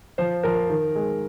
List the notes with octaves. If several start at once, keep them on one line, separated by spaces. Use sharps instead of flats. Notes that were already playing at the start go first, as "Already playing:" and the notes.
F3 C5
F3 A#4
D#3
G#3